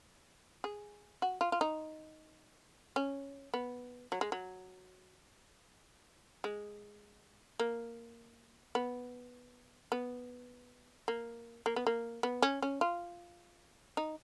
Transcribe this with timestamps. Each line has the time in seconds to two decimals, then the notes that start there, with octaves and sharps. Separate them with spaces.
0.64 G#4
1.22 F#4
1.41 F4
1.52 F4
1.61 D#4
2.96 C#4
3.54 B3
4.12 F#3
4.21 G#3
4.32 F#3
6.44 G#3
7.60 A#3
8.75 B3
9.92 B3
11.08 A#3
11.66 A#3
11.76 B3
11.87 A#3
12.23 B3
12.42 C#4
12.62 C#4
12.81 F4
13.97 D#4